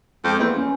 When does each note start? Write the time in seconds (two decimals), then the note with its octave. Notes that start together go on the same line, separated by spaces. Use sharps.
0.24 F2 G#3
0.39 E2 A#3
0.55 C#4